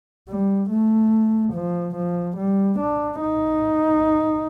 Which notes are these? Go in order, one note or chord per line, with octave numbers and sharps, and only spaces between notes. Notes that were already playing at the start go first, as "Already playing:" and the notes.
G3
A3
F3
F3
G3
D4
D#4